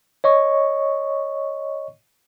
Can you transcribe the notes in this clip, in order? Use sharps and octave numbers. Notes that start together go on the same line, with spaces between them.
C#5 D#5 C#6